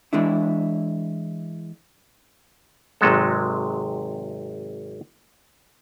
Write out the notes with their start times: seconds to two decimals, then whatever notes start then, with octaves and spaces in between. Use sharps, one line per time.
0.13 E3 G#3 D4 E4
3.01 G#1 C3 F#3 G#3 A4